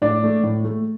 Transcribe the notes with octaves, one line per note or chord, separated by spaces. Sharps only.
A2 D4 D5
A3
A2
A3